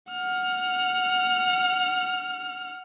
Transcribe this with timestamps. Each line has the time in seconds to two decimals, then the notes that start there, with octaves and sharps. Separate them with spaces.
0.12 F#5 F6